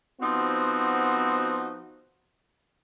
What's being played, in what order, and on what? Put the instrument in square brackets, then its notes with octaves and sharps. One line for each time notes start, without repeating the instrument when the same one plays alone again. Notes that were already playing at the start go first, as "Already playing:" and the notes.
[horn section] F3 B3 C4 D#4 F#4